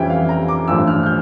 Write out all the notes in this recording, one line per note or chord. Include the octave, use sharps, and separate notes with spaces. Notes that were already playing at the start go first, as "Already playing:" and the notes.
Already playing: F2 E3 G3 C#4 E4 G5
F5
A#5
D6
A1 G2 F3 A3 E6
F6
F6
G6